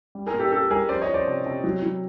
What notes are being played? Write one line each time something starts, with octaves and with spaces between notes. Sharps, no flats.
G3
G#4 A#4
A#2
G4 A4
A#2 G4 A4
G3 G#4 A#4
F3 C5 D5
C#5 D#5
F3
C5 D5
C3
C3
F#3
F#3